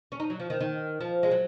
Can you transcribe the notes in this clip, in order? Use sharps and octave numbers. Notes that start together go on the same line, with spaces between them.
C#4
D#4
F#3
F3
D#3
D#3
F3
G#3
F#3